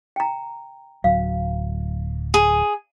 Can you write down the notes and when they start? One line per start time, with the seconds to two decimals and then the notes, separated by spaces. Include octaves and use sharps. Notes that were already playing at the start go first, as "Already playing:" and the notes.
0.16 G5 A#5
1.04 D1 F#3 F5
2.34 G#4